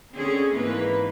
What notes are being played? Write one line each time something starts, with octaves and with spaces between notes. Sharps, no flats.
D3 C4 C#4 G#4
G#2 E3 A#3 B4